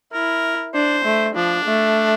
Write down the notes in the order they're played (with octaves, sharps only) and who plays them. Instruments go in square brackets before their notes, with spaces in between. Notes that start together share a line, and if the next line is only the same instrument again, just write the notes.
[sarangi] E4 [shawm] A#4
[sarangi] D4 [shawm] C5
[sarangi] A3
[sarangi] F3 [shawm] D4
[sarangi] A3